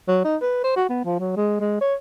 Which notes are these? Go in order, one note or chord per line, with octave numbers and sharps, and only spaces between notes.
F#3
D#4
B4
C5
F#4
B3
F3
F#3
G#3
G#3
C#5